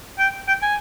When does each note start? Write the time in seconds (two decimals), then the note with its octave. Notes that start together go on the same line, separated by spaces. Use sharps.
0.19 G5
0.48 G5
0.63 G#5